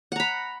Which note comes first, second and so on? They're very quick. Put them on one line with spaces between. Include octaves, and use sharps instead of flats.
F#5 A#5 B5